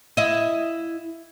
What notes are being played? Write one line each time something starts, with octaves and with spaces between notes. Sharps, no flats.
E4 D#5